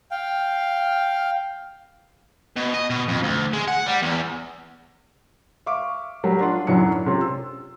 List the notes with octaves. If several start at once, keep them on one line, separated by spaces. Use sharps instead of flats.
F5 G5
B2
D#5
B2
F2
D2
G#3
F#5
G3
E2
E5 F5 C#6 D6
F#3 G3 A#4
D4 F4 D5 F#5
B1 F#2 F#3 D4 E4 C#7
C3 C#4 F4
E6